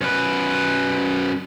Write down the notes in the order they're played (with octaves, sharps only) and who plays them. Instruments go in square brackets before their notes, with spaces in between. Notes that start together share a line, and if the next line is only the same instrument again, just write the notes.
[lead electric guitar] F#2 B4